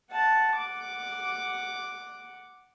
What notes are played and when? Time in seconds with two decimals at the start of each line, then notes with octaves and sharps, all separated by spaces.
0.11 F#5 A5
0.56 F#5 D6